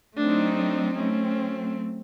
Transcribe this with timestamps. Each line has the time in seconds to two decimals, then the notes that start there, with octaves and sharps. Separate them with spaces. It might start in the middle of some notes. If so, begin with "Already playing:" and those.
0.16 F#3 A3 C4 D4 D#4
0.57 D4
0.97 F#3 A3 C4 C#4